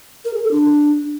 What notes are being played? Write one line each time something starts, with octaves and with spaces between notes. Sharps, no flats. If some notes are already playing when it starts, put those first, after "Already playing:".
A#4
G#4
A4
D4